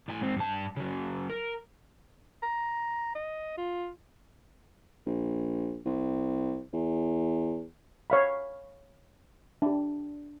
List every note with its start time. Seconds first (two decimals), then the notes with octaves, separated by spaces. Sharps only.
0.09 A2 G#5
0.22 G#2 C4
0.37 G2 A5
0.76 C#3 F#3
1.30 A#4
2.43 A#5
3.15 D#5
3.58 F4
5.06 A#1
5.85 C2
6.73 E2
8.10 C#5 F5 B5
9.62 D4 G4